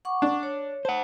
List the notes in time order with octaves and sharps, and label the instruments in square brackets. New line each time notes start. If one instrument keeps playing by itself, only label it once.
[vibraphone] F#5 C#6 D6
[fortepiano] D4
[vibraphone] C#5
[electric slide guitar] C5 F#5 [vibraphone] A5